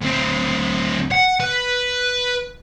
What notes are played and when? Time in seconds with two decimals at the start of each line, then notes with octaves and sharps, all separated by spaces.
0.01 D2 C4
1.11 F#5
1.40 B4